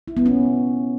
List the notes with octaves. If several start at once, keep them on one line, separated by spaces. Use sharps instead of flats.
E4
B3
C#4